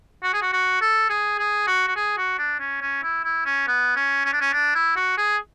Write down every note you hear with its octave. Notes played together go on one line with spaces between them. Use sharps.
F#4
G#4
F#4
F#4
A4
G#4
G#4
F#4
F#4
G#4
F#4
D4
C#4
C#4
E4
E4
C#4
B3
C#4
C#4
D4
C#4
D4
E4
F#4
G#4